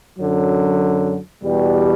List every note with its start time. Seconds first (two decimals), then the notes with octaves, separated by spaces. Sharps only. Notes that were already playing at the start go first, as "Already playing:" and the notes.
0.18 F#2 D3 F#3
1.43 E2 B2 G3